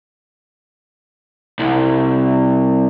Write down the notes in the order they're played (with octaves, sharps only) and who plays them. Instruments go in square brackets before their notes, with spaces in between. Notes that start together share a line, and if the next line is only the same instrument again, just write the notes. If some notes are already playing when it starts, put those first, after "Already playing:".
[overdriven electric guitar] C2